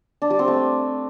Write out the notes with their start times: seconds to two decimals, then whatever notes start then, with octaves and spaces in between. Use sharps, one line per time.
0.22 D4
0.30 G3
0.39 C4
0.48 A3